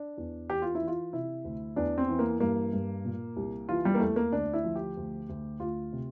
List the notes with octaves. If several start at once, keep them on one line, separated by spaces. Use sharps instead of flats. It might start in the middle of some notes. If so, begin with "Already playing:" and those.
Already playing: D4
E2
E3 G4
F4
E4
E3
F4
C3 E4
D2
E2 D4
C4
E3
A#3
G2 A#3
G2
A#2
C2
E3 F4
G3
A#3
E2 A3
A#3
D2 D4
E4
F3
G4
D2
D2
D2 F4
C3